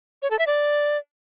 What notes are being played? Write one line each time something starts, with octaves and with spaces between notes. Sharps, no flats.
C#5
A4
E5
D5